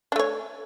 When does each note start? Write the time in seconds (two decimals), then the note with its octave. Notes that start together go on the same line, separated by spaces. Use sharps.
0.12 D4
0.16 A3
0.19 C#5